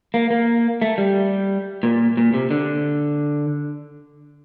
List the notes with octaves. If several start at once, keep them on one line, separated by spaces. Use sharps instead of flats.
A#3
A#3
A3
G3
A#2
A#2
C3
D3